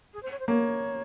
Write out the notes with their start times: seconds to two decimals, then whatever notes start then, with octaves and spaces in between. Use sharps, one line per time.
0.14 G#4
0.23 C5
0.31 C#5
0.39 C5
0.48 A#3 C#5